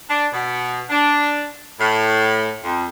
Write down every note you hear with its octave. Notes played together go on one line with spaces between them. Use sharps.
D4
B2
D4
A2
F2